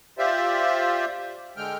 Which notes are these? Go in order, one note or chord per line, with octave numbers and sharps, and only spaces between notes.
F4 G4 C5 D5 E5
D3 G#3 G5 F6